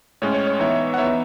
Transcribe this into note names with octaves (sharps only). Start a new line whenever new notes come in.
A2 G#3 C#4 C#5
C#5
C#5
E3 B3 D#4 C#5 E5
F#5
E3 B3 D#4 C#5 E5